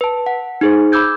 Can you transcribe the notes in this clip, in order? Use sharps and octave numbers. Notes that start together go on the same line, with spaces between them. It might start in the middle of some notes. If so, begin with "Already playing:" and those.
B4 A5
F#5
D#4 G#4 C5
B5 D6 E6 G6 G#6